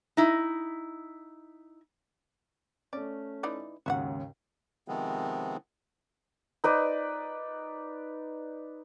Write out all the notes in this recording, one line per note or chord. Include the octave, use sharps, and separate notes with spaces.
D#4 E4
A3 C#4 D5
E3 D#4 D5
D#2 G#2 C#3 F#4 E5 F#5
C3 D#3 F3 G#3 B3 C4
D#4 B4 D5